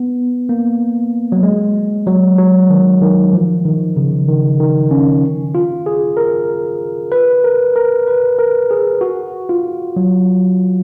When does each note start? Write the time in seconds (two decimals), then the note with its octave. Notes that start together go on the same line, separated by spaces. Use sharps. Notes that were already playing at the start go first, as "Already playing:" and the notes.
Already playing: B3
0.49 A#3
1.32 F#3
1.43 G#3
2.07 F#3
2.38 F#3
2.70 D#3
3.01 D#3
3.33 F3
3.65 D#3
3.96 C#3
4.28 D#3
4.60 D#3
4.91 C#4
5.55 F4
5.86 G#4
6.17 A#4
7.12 B4
7.44 A#4
7.76 A#4
8.07 B4
8.39 A#4
8.71 G#4
9.01 F#4
9.49 F4
9.96 F#3